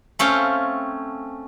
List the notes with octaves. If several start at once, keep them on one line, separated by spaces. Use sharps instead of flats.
A3 C4 C#4 A4 F5 G5